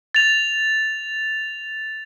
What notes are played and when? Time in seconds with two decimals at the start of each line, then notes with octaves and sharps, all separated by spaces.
0.15 A6 F7